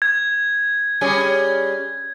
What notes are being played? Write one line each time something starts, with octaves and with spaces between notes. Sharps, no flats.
G#6
G3 C#4 G#4